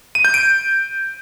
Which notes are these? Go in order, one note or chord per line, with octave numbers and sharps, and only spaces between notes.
D#7
G6
D7